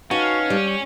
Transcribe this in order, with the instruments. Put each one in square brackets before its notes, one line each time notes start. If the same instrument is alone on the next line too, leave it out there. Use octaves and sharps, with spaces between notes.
[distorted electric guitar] C#4 [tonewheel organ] D#4 B4 A5 [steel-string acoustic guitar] F#4 [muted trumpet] F5
[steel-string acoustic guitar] G3